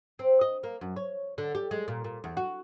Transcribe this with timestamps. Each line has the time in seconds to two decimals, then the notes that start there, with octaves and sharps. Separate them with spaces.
0.19 C4
0.41 D#5
0.63 A#3
0.81 F#2
0.96 C#5
1.38 D3
1.55 G4
1.71 G#3
1.88 A#2
2.04 A#2
2.24 E2
2.37 F#4